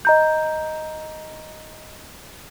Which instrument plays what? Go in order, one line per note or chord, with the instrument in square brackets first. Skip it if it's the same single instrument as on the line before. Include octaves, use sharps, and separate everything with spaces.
[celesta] D#5 A#5 G6